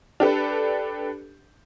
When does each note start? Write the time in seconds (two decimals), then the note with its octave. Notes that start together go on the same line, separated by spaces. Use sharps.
0.20 D4 G4 A4 B4